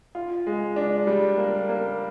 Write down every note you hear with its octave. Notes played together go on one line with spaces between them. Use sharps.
F4
G#3
D4
G3
A#3
A#3